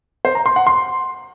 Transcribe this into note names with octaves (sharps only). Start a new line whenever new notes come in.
C5
A#5
C6
F#5
C6